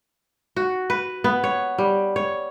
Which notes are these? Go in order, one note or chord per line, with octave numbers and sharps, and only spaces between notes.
F#4
B4
B3
C#5
G3
C#5